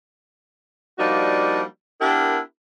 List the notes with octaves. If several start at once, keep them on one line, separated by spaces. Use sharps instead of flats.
F3 G3 A#3 D4 D#4 F#4
B3 D4 E4 G4 A#4